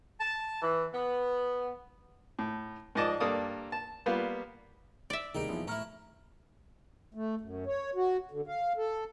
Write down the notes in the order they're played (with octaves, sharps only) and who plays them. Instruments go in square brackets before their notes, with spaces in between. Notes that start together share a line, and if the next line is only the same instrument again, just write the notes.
[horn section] A5
E3
B3
[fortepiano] A2
G#2 F3 D5 D#5 A5 D6
G2 A#3 A4 D5 D#6
A5
G3 A#3 B3 F4
[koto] D5 E5
[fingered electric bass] D2 C3 D#3 [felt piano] G3 A#3 D7 [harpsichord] D#4 G#4
[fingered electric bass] D#1 [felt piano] E3 F3 B3
[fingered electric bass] A2 [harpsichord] C#4 E4 [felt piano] A#5 F6
[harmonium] A3
F#2
C#5
F#4
D3
F5
A4